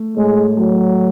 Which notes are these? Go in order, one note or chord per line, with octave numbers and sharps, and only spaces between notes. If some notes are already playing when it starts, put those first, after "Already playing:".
Already playing: A3
A2 G#3
F#3 A3